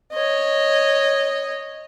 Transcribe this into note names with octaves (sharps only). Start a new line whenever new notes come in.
C#5 D#5